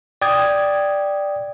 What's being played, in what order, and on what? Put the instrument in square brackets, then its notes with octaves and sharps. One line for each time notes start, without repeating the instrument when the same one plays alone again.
[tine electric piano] D5 G5 D#6 G#6